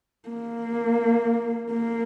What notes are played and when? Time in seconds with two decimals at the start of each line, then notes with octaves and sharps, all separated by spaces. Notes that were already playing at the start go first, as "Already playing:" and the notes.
0.29 A#3
1.71 A#3